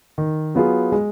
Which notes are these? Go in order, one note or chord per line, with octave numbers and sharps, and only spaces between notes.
D#3
F#3 B3 F4 G#4
G#3